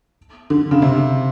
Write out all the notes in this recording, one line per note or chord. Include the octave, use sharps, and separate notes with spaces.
D3
C#3
C3